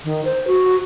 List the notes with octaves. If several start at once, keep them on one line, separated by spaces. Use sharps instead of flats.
D#3
C5
F#4